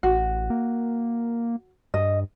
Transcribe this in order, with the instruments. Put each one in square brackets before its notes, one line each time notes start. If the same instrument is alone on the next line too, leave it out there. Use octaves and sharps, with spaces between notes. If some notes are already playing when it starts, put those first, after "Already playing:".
[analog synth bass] A1 [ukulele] F#4
[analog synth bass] A#3
[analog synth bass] G2 [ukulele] D#5